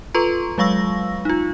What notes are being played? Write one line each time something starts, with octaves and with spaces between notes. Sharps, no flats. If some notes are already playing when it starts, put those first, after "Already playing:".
F4 A4 B4 A#5 C6 C#6
F#3 G#3 F5 C#6 E6 A#6
D#4 F4